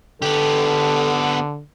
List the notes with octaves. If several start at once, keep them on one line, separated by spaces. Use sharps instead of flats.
D3 B3 G4 A4